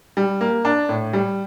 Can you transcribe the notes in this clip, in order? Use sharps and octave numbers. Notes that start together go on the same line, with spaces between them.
G3
A#3
D4
A2
G3